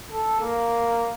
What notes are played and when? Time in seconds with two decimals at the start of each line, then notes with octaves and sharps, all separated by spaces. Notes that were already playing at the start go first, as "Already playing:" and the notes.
0.11 A4
0.41 A#3